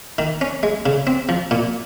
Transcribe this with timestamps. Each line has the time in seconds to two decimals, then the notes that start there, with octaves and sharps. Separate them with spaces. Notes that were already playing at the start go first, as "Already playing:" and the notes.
0.18 D#3
0.41 C#4
0.63 G#3
0.86 C#3
1.07 C4
1.29 F3
1.51 A#2